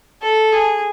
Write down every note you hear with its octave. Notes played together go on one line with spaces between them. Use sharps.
A4
G#4